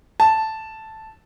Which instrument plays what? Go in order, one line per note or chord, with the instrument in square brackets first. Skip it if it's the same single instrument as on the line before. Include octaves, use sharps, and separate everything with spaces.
[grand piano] A5